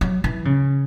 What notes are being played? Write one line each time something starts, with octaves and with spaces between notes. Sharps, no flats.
F#3
E3
C#3